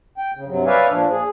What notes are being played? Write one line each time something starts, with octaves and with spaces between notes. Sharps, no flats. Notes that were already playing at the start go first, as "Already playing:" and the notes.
G5
C#3
G2 C3 F#3
B4 C#5 D5 E5 F5 G#5
A#2 F3 D4
G#4